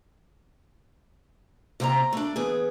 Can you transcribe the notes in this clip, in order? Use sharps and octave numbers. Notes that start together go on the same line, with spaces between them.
C3 A#3 C4 E5 A#5
A3 D4
E3 B3 G#4